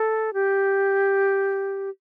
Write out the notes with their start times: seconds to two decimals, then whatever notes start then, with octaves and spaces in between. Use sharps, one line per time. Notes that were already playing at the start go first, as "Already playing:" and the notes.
Already playing: A4
0.34 G4